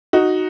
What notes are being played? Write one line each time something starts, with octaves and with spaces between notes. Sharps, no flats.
D#4 F#4